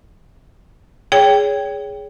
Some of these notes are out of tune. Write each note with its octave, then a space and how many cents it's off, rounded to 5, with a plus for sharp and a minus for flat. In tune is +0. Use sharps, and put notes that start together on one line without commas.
G#4 +0 C#5 +25 G5 +0